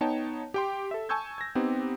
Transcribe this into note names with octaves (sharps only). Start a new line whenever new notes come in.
B3 D#4 C#5 G5 A5
G4 G5 C6
A4 E5
G#5 A5 C#6 E6 G6 G#6
G#6 A#6
B3 C4 D#4 G4